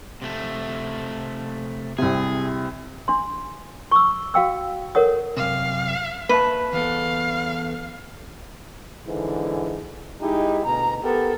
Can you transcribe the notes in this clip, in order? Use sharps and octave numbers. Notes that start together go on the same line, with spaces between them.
C3 A3
C2 C3 G#4
D4 C6
C#6 D6 E6
F#4 F5 G5 E6
A4 A#4 C#5 F#5 D#6
F#2 C3 F5
A#3 B4 E5 A5
E2 B3 A4 F5
G#2 D3 E3
G#3 D#4 E4 G4
D2 B2 A#5
B3 G4 A4 A#4